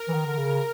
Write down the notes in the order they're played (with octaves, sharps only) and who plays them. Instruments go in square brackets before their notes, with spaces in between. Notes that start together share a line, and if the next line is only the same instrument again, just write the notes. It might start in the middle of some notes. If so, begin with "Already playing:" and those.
Already playing: [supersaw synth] A#4
[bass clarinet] E3
D#3
D3
C#3